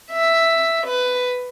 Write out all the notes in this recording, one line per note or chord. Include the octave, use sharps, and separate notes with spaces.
E5
B4